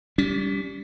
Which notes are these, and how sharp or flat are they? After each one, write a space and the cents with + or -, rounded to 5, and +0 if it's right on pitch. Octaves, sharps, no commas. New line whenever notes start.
G3 +0 C#4 +45